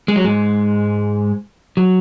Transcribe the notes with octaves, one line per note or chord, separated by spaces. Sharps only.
G#3
F#3
G#2 G#3
F#3